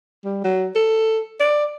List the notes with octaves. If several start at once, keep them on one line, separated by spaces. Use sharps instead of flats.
G3
F#3
A4
D5